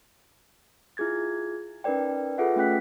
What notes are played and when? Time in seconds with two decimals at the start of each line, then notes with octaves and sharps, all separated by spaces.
0.97 E4 F4 G#4 G#6 A6
1.84 C#4 D#4 A#4 B4 D5 G5
2.38 F4 G#4 A4 B4 E5 F#5
2.56 A3 C#4 G5 F#6 B6